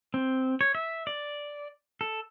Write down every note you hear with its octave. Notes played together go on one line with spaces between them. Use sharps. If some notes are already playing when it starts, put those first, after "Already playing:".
C4
C#5
E5
D5
A4